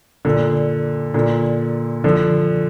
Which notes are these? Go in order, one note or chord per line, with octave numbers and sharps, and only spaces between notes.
A#2 D3
A#2 D3
D3 F3